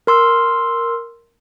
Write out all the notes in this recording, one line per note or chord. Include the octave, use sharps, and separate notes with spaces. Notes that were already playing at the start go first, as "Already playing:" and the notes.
A#4 C6 E6